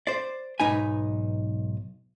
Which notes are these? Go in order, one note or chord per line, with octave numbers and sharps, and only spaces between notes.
C5 D5
B1 G#2 D#4 B4 G#5